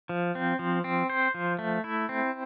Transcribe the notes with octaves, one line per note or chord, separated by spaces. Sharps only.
F3
C4
F3
C4
C5
F3
A3
E4
C4